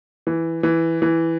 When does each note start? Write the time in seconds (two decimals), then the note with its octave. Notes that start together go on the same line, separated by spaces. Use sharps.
0.27 E3
0.63 E3
1.02 E3